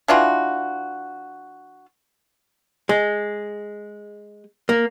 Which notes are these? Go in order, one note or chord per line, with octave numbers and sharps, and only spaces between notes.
E3 D4 F4 F#4
G#3
A#3